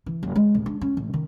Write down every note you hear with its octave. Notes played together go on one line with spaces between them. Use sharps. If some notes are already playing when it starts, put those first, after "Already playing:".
E3
F#1
G#3
D#1
D4
C#4
A1
D#3